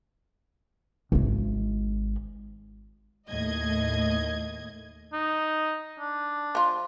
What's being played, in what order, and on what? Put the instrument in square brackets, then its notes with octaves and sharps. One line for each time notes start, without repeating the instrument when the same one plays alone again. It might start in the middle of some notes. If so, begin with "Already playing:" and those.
[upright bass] G#1 G#3
[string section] D#2 A2 D#5 G#6
[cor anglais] D#4
D4
[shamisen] F3 F4